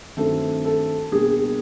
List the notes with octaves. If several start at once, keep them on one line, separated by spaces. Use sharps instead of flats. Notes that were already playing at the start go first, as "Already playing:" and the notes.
G2 D#3 F#3 A3 C4 A4
A4
B2 G3 A#3 D4 G#4